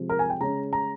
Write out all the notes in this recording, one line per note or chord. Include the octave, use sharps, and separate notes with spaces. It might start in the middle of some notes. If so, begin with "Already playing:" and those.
Already playing: C3 F3 G#3
A#4
G#5
G5
C#3 G#3 C#4 A#5
A#5